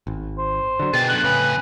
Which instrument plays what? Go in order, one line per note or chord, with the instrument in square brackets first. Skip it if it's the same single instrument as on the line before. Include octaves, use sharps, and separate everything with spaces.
[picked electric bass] G#1
[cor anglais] C5
[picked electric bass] D3 F#3
[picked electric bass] B2 [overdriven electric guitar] G#4 G5 [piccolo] A6
[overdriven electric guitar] F#2 D3 [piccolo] F#6
[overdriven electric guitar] F2 G#4 [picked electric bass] A2 C#3 [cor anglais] B4